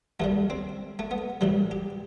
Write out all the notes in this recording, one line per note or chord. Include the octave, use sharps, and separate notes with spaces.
D#2 D#3 G3 A3
C4
A3
B3
A1 A2 E3 G3
G4